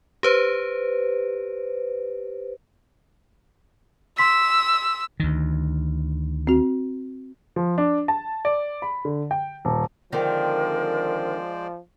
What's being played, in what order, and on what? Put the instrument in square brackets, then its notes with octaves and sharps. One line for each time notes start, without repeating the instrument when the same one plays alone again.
[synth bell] G4 B4 C5
[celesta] C6 B6 [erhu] E6
[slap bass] D2 D#3
[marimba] C4 F#4
[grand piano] F3
D4
A5
D5
B5
D3
G5
D#1
[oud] D3 D#3 C4 [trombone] F3 [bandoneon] G#3 C5 D5 [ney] A#4